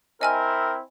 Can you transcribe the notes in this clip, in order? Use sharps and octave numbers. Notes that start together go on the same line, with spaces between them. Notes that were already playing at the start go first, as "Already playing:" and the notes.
C4 E4 A#4 D#5 G#5 F6